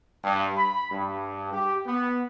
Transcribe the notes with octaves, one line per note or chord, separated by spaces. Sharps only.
G2
B5
G2
G4
B3